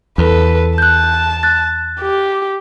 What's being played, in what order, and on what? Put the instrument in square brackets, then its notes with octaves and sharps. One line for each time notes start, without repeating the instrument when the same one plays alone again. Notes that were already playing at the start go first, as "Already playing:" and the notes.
[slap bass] E2 [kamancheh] A4 B4
[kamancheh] A5 [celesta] F#6 G6
[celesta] F#6 A6
[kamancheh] G4